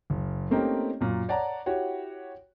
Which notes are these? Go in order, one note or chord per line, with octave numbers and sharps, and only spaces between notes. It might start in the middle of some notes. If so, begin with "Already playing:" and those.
F#1
A3 A#3 C4 C#4 D#4 G4
F#2 A#2
C#5 D5 F#5 A5 A#5
E4 F#4 G4 C#5 F#5